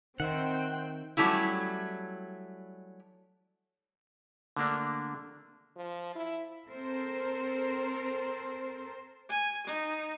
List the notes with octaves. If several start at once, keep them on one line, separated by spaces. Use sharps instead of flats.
D#3 C4 C5 E5 F#5 G5
F#3 G3 A3 C#4 E4
D3 A3 A#3 D4
F3
E4
C4 A4 A#4 C5
G#5
D#4